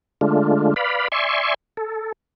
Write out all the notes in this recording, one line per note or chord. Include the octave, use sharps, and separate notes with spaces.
D3 G#3 A3 D4 F4
B4 D5 F5 B5
D5 E5 G#5 C6 C#6
A4